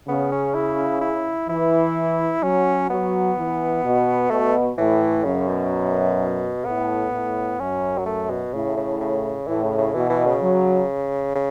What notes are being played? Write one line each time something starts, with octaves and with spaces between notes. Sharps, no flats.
C#3 B3
C#4
E4
E4
E3 E4
F#3 C#4
F#3 B3
E3
B2
B2 A3
A2 E3
F#2 C#3
B2
A2 B3
A2
F#2 C#4
F#3
A3
B2
A2 C#3
C#3
C#3
A2 E3
C#3
C#3
B2 E3
E3
C#3
F#3
C#3